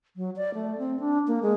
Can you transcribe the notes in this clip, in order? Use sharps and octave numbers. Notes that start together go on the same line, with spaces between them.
F#3
D5
A3
C4
D4
A#3
G#3